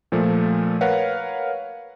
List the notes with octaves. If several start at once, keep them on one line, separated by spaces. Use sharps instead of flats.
A#2 F3 A3
A#4 B4 C#5 F5 F#5